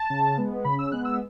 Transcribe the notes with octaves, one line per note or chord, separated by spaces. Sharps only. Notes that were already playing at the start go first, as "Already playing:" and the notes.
Already playing: A5
C#3
G#3 B3
C#3 B5
E6
G#3 B3 F#6
E6